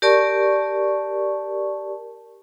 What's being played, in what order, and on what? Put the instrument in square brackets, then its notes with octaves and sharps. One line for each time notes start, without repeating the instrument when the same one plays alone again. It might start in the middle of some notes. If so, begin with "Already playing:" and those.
[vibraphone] G4 A#4 D5 A5 C#6